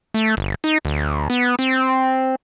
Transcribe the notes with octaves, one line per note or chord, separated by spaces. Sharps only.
A3
G1
D#4
D2
B3
C4